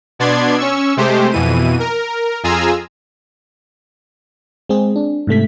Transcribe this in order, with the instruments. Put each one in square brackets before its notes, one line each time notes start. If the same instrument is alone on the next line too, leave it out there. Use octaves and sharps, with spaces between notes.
[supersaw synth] B2 B3 D4 D5 C6 G#6
C#4 C#6 E6
C3 G#3 A3 G4 C5
F2 B2 E3 D#7
A#4
F2 F4 G#4 G#5 A#5 E6
[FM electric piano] G#3 C4 G#4
D4
G#2 C3 A3 B6